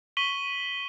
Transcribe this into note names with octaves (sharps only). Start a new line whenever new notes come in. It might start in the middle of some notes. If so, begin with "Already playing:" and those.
C#6 B6 D#7 F#7 G7